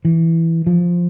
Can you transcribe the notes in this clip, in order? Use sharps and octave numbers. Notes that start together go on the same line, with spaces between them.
E3
F3